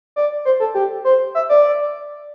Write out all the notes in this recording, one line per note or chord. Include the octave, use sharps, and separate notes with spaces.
D5
C5
A4
G4
C5
E5
D5